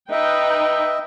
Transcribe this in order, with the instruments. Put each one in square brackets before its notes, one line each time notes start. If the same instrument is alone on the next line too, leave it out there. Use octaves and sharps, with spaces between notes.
[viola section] D#4 B4 G5 [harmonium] D#5 E5